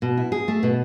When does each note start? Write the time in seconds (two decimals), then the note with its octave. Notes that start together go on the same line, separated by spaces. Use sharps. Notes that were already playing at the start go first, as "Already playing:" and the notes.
0.02 B2
0.17 E4
0.32 G#4
0.48 A3
0.63 B2